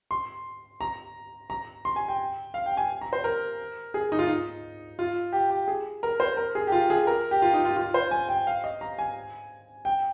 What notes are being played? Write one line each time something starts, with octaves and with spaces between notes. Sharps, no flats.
C6
A#5
A#5
C6
G#5
G5
F5
G5
G#5
A#5
C5
A#4
G#4
D#4
F4
D#4
F4
G4
G4
G#4
A#4
C5
A#4
G#4
G4
F4
G#4
A#4
G4
F4
D#4
F4
F4
C5
G#5
G5
F5
D#5
A#5
G#5
G5